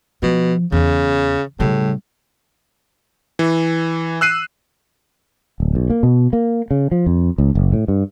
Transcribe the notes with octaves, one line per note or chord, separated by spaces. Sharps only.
B2 F3
E2 C#3
A2 C#3 G3
E3
E6 F#6 C7 D#7
D1
B1
A#3
B2
A#3
C#3
F3
F2
C#2
F#1
A2
G2